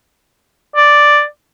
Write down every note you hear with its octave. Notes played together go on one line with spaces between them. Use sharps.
D5